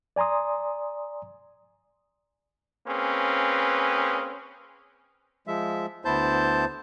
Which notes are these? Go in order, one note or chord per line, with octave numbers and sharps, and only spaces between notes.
D5 G#5 A#5 C6 D#6
A#3 C4 C#4 G#4 B4
F3 G#3 E5
D2 B3 E4 C5 A5 G6